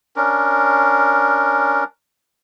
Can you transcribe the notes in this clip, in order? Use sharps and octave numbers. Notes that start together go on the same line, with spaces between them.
C#4 D4 A#4